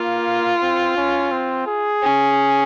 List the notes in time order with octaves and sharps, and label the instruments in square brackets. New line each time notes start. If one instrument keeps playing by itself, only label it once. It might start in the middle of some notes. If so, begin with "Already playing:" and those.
Already playing: [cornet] A#3 [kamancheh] F4
[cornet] C4
C#4
C4
G#4
[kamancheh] C#4